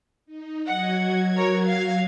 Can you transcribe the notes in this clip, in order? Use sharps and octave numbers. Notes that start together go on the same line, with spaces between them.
D#4
F#3 F#4 D#5 F#5 G#6
A#4 C#5
F5